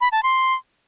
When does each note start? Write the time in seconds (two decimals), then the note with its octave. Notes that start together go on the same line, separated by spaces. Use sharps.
0.01 B5
0.12 A5
0.23 C6